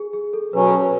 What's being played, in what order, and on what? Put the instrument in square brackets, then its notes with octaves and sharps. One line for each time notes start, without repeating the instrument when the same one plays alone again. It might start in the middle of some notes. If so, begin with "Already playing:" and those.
Already playing: [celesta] G#4
G#4
A4
[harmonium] B2 F#3 C#4 [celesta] B4
[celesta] A4
B4